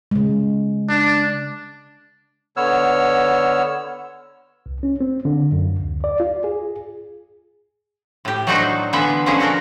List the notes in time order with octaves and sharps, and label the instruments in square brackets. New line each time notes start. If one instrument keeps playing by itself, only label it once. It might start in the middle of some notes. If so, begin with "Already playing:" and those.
[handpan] C#3 G#3
[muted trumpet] D4
[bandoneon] D3 B3 C#5 E6 F6
[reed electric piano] C2
C#4
C4
D3
F#2
D2
D5
F4
G#4
[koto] A2 G4
F#3 A3 D4 D#4 F#4 C5
D3 E3 B3 D4 F4 E5
B2 D3 F3 C#4 G#4
F#4 A4 A#4